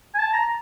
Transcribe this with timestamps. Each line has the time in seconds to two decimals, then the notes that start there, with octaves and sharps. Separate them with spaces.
0.14 G#5
0.19 A5
0.33 A#5